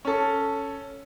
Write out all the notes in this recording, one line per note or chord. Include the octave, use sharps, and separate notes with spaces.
C#4 A4